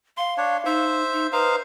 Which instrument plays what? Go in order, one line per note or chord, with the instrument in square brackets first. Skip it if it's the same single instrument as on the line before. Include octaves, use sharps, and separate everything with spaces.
[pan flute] F5 [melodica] C6
[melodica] D4 C#5
[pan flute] D#4 [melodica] C5 E5
[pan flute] D#4
[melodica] D#4 C5 F5 [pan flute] B4